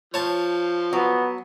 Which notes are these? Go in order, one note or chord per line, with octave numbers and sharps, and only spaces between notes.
F3 C#5 A5
F#3 B3